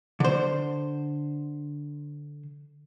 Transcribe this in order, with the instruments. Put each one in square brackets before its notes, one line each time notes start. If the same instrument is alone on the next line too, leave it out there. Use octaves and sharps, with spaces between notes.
[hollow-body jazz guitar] D3 C5